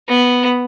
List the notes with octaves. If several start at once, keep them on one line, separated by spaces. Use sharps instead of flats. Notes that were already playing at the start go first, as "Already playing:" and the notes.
B3